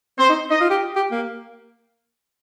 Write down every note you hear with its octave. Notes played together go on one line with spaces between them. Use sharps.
C4 C5
D#4
D#4 D#5
F4
G4
G4
A#3